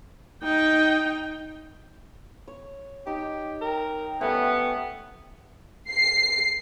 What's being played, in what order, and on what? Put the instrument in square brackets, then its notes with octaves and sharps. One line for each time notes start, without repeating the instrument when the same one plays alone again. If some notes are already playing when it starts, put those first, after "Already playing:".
[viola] D#4 G5
[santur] C#5
[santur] D#4 [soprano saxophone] G4
[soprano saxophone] A#4 [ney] G5
[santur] G3 A3 [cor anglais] B3 [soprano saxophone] C#4
[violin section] C7